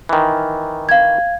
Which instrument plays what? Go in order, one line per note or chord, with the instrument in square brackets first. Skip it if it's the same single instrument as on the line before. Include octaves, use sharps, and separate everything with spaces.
[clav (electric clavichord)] D#3 E3
[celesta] F5 G#6